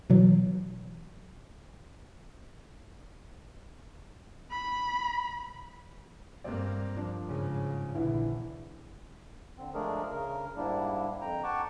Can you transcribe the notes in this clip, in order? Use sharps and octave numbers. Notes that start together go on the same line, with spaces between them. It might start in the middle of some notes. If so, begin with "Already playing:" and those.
B2 E3 F#3
B5
G2 A#3 C4 D5
F3 D4
G#2 C#3
A#1 D3 E3 E4
D3 C4
F3 G#3 A3 D4 G#4 A#4
C#3 A#4
G#2 G3 A#3 D4 E4
F2 G5 A#5
F#5 G5 A5 C#6 D6